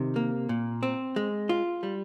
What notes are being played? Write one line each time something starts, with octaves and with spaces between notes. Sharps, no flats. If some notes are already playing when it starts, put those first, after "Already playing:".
Already playing: C3 D#3
A#3
A#2
C4
G#3
F4
G3